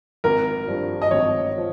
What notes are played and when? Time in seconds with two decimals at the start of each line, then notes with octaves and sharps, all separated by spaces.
0.24 G#1 A#4
0.67 G2 F3
1.02 D#5
1.11 G#1 C#5
1.58 F3